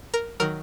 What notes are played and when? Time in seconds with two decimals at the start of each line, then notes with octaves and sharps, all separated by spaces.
0.14 A#4
0.40 D#3 F#3 A#4